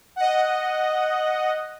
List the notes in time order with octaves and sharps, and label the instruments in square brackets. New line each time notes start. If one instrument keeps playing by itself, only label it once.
[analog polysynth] D#5 F#5